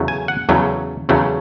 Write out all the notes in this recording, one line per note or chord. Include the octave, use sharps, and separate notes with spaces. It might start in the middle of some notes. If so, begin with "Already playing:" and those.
Already playing: E2 C#3 F#3 A3 C#4
G#5
F#5
E2 C#3 F#3 A3 C#4
E2 C#3 F#3 A3 C#4